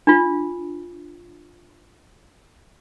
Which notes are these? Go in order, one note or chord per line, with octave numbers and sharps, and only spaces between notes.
D4 F4